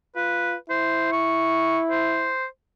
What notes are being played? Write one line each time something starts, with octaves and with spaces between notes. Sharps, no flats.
F4 B4
E4 C5
C#6
C5